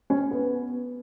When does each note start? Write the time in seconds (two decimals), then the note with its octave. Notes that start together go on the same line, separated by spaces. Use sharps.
0.10 C#4
0.31 B3